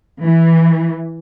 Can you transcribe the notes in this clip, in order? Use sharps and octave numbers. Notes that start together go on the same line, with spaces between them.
E3